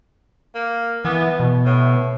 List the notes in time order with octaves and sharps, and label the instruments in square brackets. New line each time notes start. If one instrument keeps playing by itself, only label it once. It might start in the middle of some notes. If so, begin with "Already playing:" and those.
[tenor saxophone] A#3
[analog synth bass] E3 [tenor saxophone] B3
[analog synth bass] B2
[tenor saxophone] A2